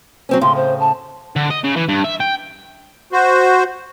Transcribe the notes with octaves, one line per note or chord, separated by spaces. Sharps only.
F#3 C4 C#4
A2 C#3 C6
C5
A5
D3
D#5
C#3
E3
G2
E5
G5
F#4 C5